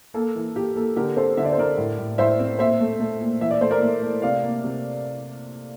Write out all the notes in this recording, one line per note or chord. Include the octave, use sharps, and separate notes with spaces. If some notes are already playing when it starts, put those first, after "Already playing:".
A#3 A4
E3
A#3 G4
A#3 A4
D3 G4 A#4
C4 A4 C5
D3 E5
D5
C5
D3 A#4 D5
A2
A2
A2 C5 E5
C4
A#2 C5 E5
A3
A3
A#2
E3 E5
D5
A3 C5
A#4 D5
A3
A3
C3 D5 F5
A#3
C3